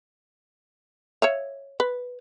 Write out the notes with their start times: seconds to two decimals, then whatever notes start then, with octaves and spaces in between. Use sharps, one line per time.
1.22 C#5 E5 F5
1.80 B4